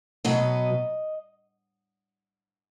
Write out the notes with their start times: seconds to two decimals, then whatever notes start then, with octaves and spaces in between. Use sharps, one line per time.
0.25 B2 F#3 B3 D#5